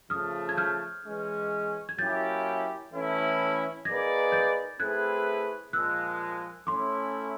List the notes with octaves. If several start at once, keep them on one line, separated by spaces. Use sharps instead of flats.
C#3 F3 A3 D#6 F6
G#6
F6 G6
E3 G#3 C#4
G#6
F#3 A#3 C#4 E4 G4 G6 A6
A2 E3 A3 C#4 E4
A#3 D#4 G#4 B4 D5 G#6 A#6
G6 A6
A3 C4 E4 G#4 B4 F#6 G#6
A#2 F3 G#3 E6 F#6
A3 C#4 E4 C6 D6